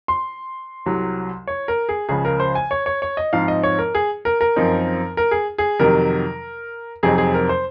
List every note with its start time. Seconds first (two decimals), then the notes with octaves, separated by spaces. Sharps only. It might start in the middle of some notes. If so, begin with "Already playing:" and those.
0.08 C6
0.86 C2 C3 F#3
1.47 C#5
1.68 A#4
1.89 G#4
2.09 C#2 C#3 F3 G#4
2.25 A#4
2.40 C5
2.55 G#5
2.71 C#5
2.86 C#5
3.02 C#5
3.17 D#5
3.33 G#2 F3 C4 D#4 F5
3.48 D#5
3.63 C#5
3.79 A#4
3.95 G#4
4.25 A#4
4.41 A#4
4.56 F#2 F3 C4 D#4
5.17 A#4
5.31 G#4
5.58 G#4
5.79 F2 C3 D#3 F#3 A#4
7.03 F2 C3 F#3 C4 D#4 G#4
7.18 G#4
7.34 A#4
7.49 C5